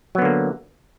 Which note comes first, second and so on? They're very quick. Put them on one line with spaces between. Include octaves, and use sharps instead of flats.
F#3 B3 D3 A#3